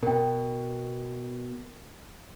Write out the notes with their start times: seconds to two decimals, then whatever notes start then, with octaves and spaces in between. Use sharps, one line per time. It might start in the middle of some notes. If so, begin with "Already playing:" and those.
0.03 B2 A#4 G5